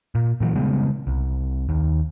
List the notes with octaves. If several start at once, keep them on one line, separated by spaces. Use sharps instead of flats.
A#2
A#2 E3 F#3
C#3 G3 G#3 B3
C2
D#2